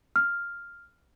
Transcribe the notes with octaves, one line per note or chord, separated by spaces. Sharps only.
F6